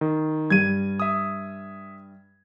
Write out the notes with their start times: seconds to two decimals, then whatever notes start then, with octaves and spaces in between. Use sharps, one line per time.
0.01 D#3
0.50 G2 G3 G#6 D#7
1.00 E5 D#6